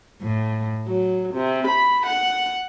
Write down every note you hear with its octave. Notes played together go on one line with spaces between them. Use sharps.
A2
F#3
C3
B5
F#5